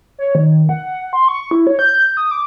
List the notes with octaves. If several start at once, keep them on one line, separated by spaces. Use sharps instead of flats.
C#5
D#3
F#5
C6
C#6
E4
C#5
G6
D#6
D6